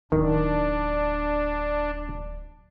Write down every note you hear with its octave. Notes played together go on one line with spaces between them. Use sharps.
D1 D#3 D4